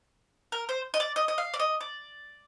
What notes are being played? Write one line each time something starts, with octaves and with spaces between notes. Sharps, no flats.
A#4
C5
D#5
D5
D#5
D#5
F5
D5
D#5
D5